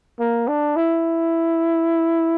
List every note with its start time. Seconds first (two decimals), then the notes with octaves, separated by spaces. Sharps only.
0.20 A#3
0.48 D4
0.76 E4